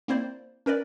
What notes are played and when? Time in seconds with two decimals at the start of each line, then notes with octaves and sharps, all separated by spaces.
0.08 A#3 C4 E4 C5 D5
0.66 C#4 A#4 B4 D5